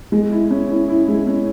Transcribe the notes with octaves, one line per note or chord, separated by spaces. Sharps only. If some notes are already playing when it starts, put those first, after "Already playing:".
G#3
E4
C#4
E4
E4
G#3
C#4